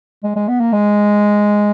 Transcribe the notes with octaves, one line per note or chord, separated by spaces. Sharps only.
G#3
G#3
B3
A#3
G#3